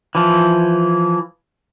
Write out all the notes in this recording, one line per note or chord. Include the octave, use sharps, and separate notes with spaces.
E3 F3